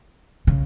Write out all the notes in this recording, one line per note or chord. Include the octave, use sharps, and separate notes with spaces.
C#3